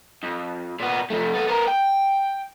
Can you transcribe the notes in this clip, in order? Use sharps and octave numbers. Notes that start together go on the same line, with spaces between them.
F2
A#2 B3
F2 A3
B3 A4
B3 A#4
G5